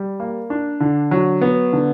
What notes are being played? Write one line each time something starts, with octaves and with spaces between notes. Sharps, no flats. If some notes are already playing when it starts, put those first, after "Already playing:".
Already playing: G3
A#3
D4
D3
F#3
B3
D3